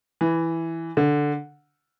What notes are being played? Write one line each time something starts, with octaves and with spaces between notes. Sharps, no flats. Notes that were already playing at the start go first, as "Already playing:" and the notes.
E3
D3